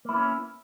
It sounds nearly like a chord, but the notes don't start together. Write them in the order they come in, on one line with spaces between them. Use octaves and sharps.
A#3 E4 B3 C#4